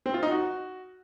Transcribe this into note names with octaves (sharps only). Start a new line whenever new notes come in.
C4
F4
D#4
F#4